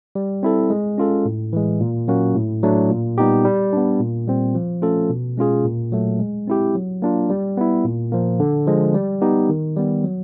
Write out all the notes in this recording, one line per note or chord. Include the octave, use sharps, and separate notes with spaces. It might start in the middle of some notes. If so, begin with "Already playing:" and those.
G3
C4 E4 A4
G#3
C#4 F4 A4
A2
E3 G#3
A#2
F#3 A#3 C#4 F#4
A2
F#3 A3 D4
A#2
G3 B3 D#4 G4
G3
B3 D4
A#2
G3 C4
F3
A3 C#4 F4 A4
B2
G#3 C#4 F4 G#4
A#2
F#3 A3
G#3
C4 E4 G4
F#3
A#3 D4 F4
G3
B3 E4
A#2
F3 A#3
D3
F3 G#3
G3
B3 D#4 G4
D#3
G3 B3
F#3